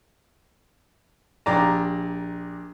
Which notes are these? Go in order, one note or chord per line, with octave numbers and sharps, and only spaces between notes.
A#1 G4 D5 A#5